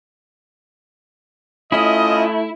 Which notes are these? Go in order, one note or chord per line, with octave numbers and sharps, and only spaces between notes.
A3 C#4 E4 F4 D#5